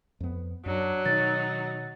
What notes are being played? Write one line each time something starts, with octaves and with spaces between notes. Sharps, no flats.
F2 B3
F#2 F#3 D4
B2 D#3 D#4 A6